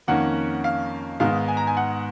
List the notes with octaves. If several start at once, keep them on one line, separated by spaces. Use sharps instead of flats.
F2 D#3 A#3 C#4 F#5
F5
G#2 D#3 G#3 B3 D#4 F5
G#5
A#5
G#5
F#5